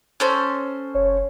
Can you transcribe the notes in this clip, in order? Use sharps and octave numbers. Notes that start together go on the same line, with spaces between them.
C#4 A4 C5
F#1 C#5